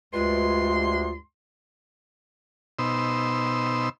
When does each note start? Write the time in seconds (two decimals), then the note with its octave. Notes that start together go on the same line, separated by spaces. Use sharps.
0.14 D2 G2 G#3 F4 C6
2.79 B2 D#4 C5 E6